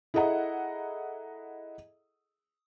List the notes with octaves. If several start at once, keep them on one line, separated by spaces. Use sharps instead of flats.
E4 G#4 A4 D#5 F#5 A#5